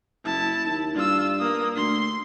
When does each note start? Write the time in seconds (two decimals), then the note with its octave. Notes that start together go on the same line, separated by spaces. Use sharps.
0.25 F#1 E4 A5
0.65 D#2
0.95 G2 F4 E6
1.39 A#3 D#6
1.76 D2 C6